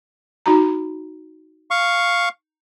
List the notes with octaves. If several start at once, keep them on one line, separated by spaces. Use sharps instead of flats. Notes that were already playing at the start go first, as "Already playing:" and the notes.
D#4 F#4 A#5
F5 C#6